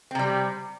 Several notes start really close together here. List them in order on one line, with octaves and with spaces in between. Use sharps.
C4 C3 G3